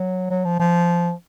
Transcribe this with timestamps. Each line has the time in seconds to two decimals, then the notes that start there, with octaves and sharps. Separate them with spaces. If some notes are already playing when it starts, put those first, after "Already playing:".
Already playing: F#3
0.30 F#3
0.45 F3
0.60 F3